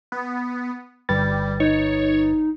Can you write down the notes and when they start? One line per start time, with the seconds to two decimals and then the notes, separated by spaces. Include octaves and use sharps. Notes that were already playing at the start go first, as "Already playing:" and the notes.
0.12 B3
1.09 G1 G3 B4 A6
1.60 D#4 C#5